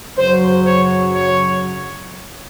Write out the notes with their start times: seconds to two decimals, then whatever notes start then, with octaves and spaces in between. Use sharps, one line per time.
0.17 F#2 C#3 F#3 C5
0.65 C#5
1.14 C#5